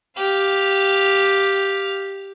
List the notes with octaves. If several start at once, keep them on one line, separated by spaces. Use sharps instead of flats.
G4 F5